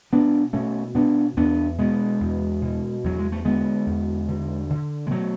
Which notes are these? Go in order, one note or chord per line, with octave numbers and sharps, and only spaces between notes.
B2 B3 D4
B2 A3 C#4
B2 B3 D4
E2 B3 D4
B2 G#3 B3
E2
B2
E2 F#3
G#3
A3
D3 G#3 B3
E2
D3
D3
G#3
B2 F#3 A3